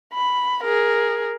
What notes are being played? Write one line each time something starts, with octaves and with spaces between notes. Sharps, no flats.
B5
G#4 A#4